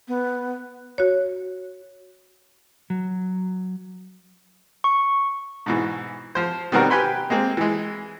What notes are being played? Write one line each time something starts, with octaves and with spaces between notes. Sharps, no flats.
B3
F#4 C#5
F#3
C#6
G#2 B2 E3
F3 C5
B2 D#3 G3 C4 F#4 A#4
G4 B4 G5 G#5 B5 C6
G#3 A#3 C4
E3 G#3